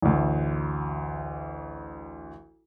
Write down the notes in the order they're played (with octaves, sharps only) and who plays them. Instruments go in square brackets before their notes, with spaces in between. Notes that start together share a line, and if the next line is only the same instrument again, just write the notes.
[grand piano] A1 D2